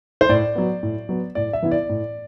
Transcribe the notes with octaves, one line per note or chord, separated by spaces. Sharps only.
C5
A2 D5
F#3 B3
A2
F#3 B3
A2 D5
E5
E3 B3 E4
D5
A2